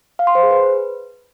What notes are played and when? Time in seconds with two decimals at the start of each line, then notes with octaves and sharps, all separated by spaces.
0.19 F5
0.27 C6
0.35 C5
0.43 G#4
0.51 B4